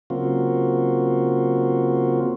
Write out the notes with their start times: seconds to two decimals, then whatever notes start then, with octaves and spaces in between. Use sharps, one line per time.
0.10 C#3 F#3 A#3 C4 F4 F#4